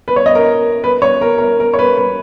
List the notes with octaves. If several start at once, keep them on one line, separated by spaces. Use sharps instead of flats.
B4
C#5
D#5
A#4
B4
C#5
A#4
A#4
A#4
C#5
B4
B4